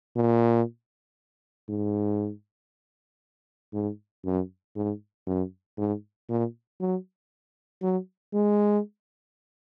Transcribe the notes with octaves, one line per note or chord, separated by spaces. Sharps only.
A#2
G#2
G#2
F#2
G#2
F#2
G#2
A#2
F#3
F#3
G#3